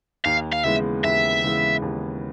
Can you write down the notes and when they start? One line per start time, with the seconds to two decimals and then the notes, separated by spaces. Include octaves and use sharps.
0.25 D#2 F5
0.53 F5
0.64 C#3 E3 G#3 B3 E5
1.04 D#2 E5
1.44 C#3 E3 G#3 B3
1.82 D#2